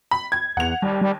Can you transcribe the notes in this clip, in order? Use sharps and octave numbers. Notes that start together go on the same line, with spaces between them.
B5
G#6
E2 F#5 F7
D#2 G3
G3